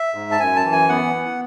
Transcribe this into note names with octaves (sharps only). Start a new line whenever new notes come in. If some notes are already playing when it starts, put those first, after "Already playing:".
Already playing: E5
G#2
A5
F#2 G#5
A5
E3
G#5
B3 F#5
B3